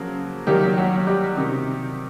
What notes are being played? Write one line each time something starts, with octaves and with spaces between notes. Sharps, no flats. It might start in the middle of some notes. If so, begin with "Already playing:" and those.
Already playing: C#3 F3 F#3 A#3
D#3 F#3 G3 A#3 G4
F#3 F#4
G3 G4
C3 D#3